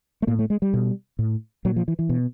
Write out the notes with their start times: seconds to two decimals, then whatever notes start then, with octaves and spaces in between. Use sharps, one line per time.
0.22 A3
0.27 A2 A#3
0.39 A3
0.50 G#3
0.62 G3
0.74 B2
1.19 A2
1.65 A#2 F#3
1.76 F3
1.88 E3
1.99 E3
2.09 B2